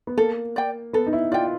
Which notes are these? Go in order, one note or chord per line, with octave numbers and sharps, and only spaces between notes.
B3
A#3 A4
D5 G5
B3 A4
D#4
E4
F4 D5 G5